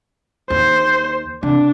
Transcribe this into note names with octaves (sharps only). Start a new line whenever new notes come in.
D#2 C5
C3 D4